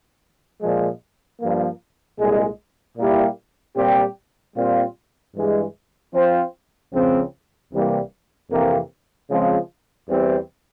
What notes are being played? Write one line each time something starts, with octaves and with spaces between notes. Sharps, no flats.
A#2 F3 G#3
G2 F3 A#3
C2 A#2 G#3
A#2 G3 A#3 E4 G4
A#2 G3 C4 G4
A#2 G3 C4 F4
G2 E3 G#3
F3 C4 F4 C5
C#2 C#3 F3 C4
C2 C3 E3 G3 A#3
F2 C3 E3 A#3
C#3 F3 G#3 C4 F4
E2 E3 G3 C4